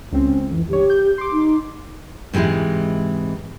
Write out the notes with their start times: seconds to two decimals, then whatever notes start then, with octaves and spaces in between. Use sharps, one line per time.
0.12 C#2 C4 C#4
0.51 F2 E3
0.69 C#2 G2 G4 C#5
0.90 G6
1.18 C6 D6
1.32 D#4
2.33 G#2 C3 E3 G#3 E4